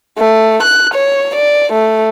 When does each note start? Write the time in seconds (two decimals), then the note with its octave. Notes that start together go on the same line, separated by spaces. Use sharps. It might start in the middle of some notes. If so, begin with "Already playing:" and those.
0.18 A3
0.62 F#6
0.94 C#5
1.35 D5
1.72 A3